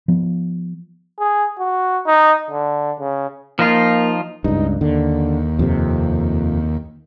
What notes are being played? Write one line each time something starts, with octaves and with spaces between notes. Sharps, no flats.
F3 B3
G#4
F#4
D#4
D3
C#3
F3 A#3 D#4 F4
C#2 G2 D#4
D#2 D3
F2 C3